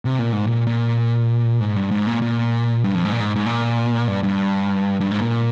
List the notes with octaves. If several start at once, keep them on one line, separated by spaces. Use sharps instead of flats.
C3
A#2
G#2
A#2
A#2
G#2
G2
G#2
A#2
A#2
G2
F2
G#2
A#2
G#2
G#2
A#2
G2
G2
G2
G#2
A#2